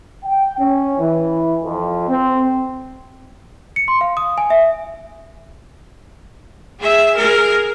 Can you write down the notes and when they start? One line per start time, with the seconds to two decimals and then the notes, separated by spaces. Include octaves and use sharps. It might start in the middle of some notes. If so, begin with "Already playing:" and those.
0.25 G5
0.58 C#4
0.99 E3
1.63 F2
2.09 C4
3.76 C#7
3.88 C6
4.01 F5
4.17 D#6
4.38 G#5
4.50 E5
6.80 G#4 E5
7.14 G#4 A#4